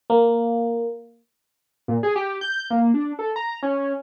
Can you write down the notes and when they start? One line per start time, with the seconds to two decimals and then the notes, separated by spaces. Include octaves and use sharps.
0.10 A#3
1.88 A#2
2.03 G#4
2.16 G4
2.41 G6
2.70 A#3
2.94 D4
3.19 A4
3.36 A#5
3.63 C#4